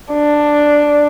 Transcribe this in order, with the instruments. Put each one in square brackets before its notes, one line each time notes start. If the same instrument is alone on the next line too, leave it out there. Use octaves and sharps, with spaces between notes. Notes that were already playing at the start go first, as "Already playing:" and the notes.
[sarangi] D4